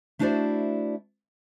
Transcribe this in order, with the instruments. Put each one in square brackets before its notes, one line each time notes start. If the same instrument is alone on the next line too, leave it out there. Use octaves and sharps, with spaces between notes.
[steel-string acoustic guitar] A3 D4 E4 F#4 C5 D5